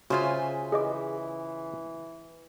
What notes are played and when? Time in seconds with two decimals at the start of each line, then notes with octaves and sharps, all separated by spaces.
0.10 C#3 F4 F#4 C5 E5 G#5
0.72 E3 G#4 D#5 D6